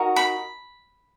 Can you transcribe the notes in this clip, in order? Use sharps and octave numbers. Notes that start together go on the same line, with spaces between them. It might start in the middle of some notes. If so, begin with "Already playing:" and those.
Already playing: D#4 F#4 A#4
B5